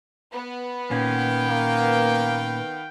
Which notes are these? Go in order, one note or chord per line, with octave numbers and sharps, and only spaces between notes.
B3
A#2 D#3 C#4 F5 G5
A#3